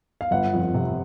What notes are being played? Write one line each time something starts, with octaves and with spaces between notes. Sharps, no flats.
F5
G1 F#5
F2
C3